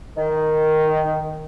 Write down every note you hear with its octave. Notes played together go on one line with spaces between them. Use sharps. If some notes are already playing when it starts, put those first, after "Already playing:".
D#3